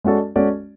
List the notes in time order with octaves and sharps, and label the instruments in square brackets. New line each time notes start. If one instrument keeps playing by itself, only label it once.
[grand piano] G#3 C#4 F#4 A4 D5
G#3 C#4 F#4 A4 D5